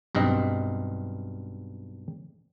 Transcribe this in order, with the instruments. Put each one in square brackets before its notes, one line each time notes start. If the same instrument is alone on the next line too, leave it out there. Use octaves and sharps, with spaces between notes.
[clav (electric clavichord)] B1 G2 C4 D#5